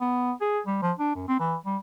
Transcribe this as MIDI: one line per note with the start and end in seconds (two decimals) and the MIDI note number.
0.01 0.32 59
0.42 0.59 68
0.66 0.78 55
0.82 0.93 53
0.99 1.15 62
1.15 1.25 42
1.28 1.40 60
1.40 1.56 52
1.65 1.78 55